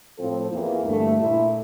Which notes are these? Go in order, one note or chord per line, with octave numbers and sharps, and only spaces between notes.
A2 F3 C4 F4 A4
E2 E3 A#3
G2 D3 A3
A#2 A3 E4